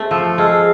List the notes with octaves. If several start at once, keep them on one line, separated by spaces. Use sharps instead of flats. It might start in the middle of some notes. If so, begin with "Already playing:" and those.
Already playing: A3 C4
F3 A4
G#3 F5